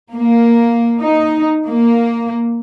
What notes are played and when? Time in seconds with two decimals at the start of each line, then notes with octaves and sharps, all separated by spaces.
0.13 A#3
1.01 D#4
1.68 A#3